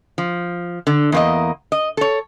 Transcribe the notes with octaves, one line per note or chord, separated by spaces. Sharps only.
F3
D3
E2 A#3 D#5
D#5
A4 C#5